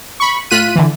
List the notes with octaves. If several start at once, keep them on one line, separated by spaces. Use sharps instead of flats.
B5 C#6
A2 F4 F#6 B6 D#7
D3 E3